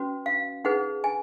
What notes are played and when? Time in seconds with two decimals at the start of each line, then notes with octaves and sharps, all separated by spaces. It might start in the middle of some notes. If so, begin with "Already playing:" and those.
Already playing: C#4 F#4 B4
0.26 F5
0.64 D#4 G#4 B4 F#5
1.04 G#5